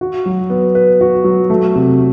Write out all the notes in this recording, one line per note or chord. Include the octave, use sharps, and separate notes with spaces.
F#4
F#3
B3
B4
F#4
F#3
A3
C3